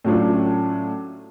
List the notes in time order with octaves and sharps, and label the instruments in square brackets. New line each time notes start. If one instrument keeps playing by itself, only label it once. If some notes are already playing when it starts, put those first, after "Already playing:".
[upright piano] A2 F#3 A3 C#4 D4 F4